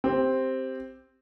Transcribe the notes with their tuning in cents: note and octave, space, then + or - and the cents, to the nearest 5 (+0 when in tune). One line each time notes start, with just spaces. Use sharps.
C4 +0 G4 +0